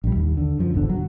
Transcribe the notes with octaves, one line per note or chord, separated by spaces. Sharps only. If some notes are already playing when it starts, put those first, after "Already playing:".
A#1 G3
D#2
D3
F#2 F3
D1 G1 E2 D3
F#3